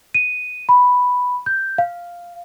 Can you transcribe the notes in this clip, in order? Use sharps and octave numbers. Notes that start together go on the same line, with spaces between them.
D#7
B5
G6
F5